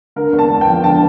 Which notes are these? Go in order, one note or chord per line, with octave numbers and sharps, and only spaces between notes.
D3 A#4
E2
A5
E2
G5
F3
D3 A5